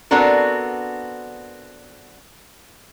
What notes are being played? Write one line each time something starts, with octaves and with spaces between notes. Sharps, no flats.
B3 C4 D4 F#4 A4 A#4